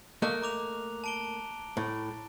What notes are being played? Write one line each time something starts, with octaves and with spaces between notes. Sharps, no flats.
A3 A#3 D#5 F#6
A#5 D6 F7
A5 D7 G7
A2